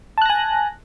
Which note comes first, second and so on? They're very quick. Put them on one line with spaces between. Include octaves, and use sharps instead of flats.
A5 F#6 A#6 G#5